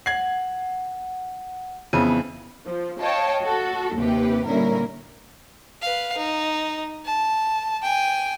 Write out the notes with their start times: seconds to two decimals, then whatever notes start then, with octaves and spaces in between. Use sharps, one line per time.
0.06 F#5 G#6 C7
1.93 F2 C#3 E3 B3
2.66 F3
3.00 C#5 D#5 F5 G5 A5
3.42 F#4 A4
3.96 D#2 C3 G4 B4
4.46 A#2 D3 G3 C#4 E4 A#4
5.82 B4 F5
6.17 D#4
7.05 A5
7.82 G5 G#5